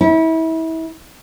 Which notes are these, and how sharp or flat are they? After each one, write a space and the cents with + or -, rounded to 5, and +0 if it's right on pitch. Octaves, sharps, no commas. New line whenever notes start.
E4 -30